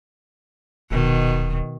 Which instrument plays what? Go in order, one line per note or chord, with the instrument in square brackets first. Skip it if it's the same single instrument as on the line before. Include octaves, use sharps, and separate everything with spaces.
[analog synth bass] D#1 [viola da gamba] B2 D#3